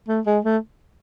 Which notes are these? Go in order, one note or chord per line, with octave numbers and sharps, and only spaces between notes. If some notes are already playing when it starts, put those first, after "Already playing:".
A3
G#3
A3